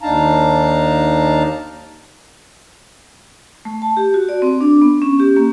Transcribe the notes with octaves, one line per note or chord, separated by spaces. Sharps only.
D#2 D4 D#4 F5 A5 A#5
A3
A5
G4
F#4
D5
C4
D4
B3
C#4
G4
A#3